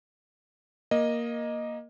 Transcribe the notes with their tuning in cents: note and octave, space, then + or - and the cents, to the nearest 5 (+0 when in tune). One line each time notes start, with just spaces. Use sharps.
A#3 +10 D#5 -5